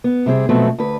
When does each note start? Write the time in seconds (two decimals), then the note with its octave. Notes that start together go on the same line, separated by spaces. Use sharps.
0.04 B3
0.26 C3 G3 C4 G#4
0.49 B2 F3 F#3 A3 B3 C4
0.78 D2 B4